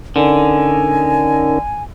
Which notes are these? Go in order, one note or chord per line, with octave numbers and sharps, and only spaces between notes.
D3 C#4 D#4 A#4 G#5